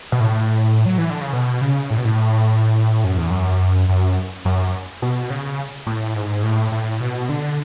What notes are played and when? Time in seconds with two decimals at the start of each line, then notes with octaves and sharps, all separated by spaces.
0.12 B2
0.20 A2
0.86 F#3
0.98 E3
1.10 D3
1.21 C#3
1.33 B2
1.61 C#3
1.90 A2
1.98 B2
2.05 A2
3.04 F#2
3.17 E2
3.30 F#2
3.89 F#2
4.45 F#2
5.02 B2
5.30 C#3
5.86 A2
6.16 G#2
6.43 A2
6.72 A2
7.00 B2
7.29 D3